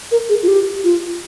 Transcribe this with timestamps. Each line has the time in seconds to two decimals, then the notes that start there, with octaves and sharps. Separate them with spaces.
0.12 A#4
0.29 G#4
0.43 F4
0.48 G4
0.84 F4